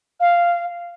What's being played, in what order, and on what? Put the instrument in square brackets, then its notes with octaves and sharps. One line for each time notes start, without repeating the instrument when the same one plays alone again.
[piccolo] F5